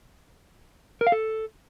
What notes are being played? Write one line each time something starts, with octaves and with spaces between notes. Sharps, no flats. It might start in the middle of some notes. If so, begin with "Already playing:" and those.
A#4
F5
A4